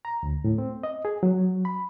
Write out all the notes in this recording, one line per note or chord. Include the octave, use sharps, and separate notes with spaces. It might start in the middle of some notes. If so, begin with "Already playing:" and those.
A#5
D2
A2
C4
D#5
G#4
F#3
B5